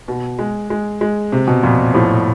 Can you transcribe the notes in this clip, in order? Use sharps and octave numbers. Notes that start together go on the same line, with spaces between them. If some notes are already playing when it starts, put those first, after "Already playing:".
B2
G#3
G#3
G#3
C3
B2
F2 A#2
A2 F3